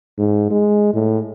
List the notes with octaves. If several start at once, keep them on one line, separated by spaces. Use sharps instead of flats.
G#2
G#3
A2